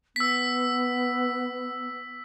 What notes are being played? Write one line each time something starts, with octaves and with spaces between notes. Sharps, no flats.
B3 E6 B6